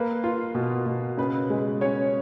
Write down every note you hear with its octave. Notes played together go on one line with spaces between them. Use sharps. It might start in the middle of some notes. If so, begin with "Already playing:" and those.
Already playing: A#3 B4
F4
B2
B2
C#3 B4
G#3
C#4 C#5